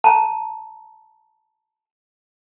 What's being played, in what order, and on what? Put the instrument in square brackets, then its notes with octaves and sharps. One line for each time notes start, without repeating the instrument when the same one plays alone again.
[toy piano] A5 A#5